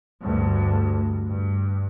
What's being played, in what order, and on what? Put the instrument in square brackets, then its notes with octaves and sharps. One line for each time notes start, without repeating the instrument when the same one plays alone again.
[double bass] D2 G2
G2